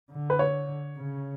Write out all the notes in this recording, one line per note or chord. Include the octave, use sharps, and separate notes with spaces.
D3
B4
C#5
C#3